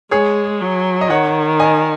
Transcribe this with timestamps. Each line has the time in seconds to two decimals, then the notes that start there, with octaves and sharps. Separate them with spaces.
0.11 G#3 G#4 C#5
0.61 F#3
1.01 D#5
1.10 D#3 C#5 F#5
1.60 D#5 G#5